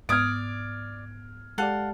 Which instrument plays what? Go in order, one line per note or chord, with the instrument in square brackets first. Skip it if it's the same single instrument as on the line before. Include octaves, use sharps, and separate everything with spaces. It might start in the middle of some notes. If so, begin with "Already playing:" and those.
[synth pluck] G#2 B3 [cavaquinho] D5 D#6 [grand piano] F6 G#6 D7
[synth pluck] G#3 G4 D5 [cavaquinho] A4 F5 F#5